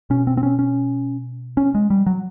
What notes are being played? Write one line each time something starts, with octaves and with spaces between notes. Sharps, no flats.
B2 C#4
C4
C4
C#4
C#4
C#4
G#3
G3
F#3